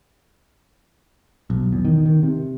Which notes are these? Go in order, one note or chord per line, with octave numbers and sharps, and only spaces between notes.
B1
E2
D#3
D#3
C3